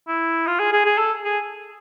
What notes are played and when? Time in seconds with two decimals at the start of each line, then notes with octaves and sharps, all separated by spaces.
0.08 E4
0.47 F4
0.60 G#4
0.72 G#4
0.85 G#4
0.99 A4
1.25 G#4